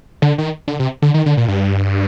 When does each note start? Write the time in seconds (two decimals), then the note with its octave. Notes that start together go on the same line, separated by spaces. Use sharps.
0.22 D3
0.38 D#3
0.68 D3
0.79 C3
1.02 D3
1.14 D#3
1.26 D3
1.37 A#2
1.48 G2